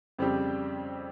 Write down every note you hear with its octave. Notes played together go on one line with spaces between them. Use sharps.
F2 C#3 G3 C4 G4